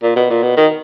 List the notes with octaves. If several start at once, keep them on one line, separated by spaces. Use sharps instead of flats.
A#2
B2
A#2
B2
D#3